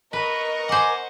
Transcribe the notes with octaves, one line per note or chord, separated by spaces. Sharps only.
A#4 B4 D#5 C#6
C5 F#5 G#5 D6